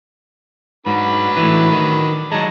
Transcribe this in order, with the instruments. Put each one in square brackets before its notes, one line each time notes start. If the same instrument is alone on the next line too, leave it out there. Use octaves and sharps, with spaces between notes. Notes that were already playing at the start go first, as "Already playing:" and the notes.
[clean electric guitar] G#2 [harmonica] F#3 D4 B4
[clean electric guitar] A2 E3
D#3
[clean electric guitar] F#3 G#3 [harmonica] A5 A#5